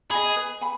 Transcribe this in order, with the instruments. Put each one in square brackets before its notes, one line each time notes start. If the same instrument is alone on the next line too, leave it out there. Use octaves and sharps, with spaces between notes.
[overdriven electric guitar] G#4 [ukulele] D#5 G#5 B5
[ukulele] B4
G#5 B5